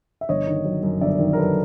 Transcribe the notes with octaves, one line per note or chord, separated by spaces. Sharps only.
E5
G1 C#5 D#5
D#3
F#3
F#2
G1 D5 E5
D#3
A#4
F#3 A4 B4